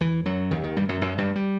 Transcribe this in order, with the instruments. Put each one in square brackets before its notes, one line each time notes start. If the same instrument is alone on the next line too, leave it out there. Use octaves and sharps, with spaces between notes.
[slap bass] E2 E3
F#2 F#3
D#2 D#3
D#2 D#3
G2 G3
F#2 F#3
F#2 F#3
G2 G3
G3